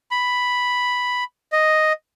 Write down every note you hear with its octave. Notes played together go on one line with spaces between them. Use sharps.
B5
D#5